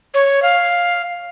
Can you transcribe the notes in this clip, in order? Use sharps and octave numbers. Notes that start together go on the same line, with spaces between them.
C#5
F5